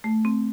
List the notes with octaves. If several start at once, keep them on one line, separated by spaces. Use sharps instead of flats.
A3
C4